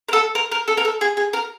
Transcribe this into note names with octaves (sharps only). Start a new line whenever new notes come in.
A#4
A4
A#4
A#4
A4
A#4
A4
G#4
G#4
A#4